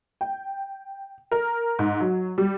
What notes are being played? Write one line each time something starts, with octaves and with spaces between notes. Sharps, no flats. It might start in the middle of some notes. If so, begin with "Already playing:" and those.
G5
A#4
G#2
F#3
G3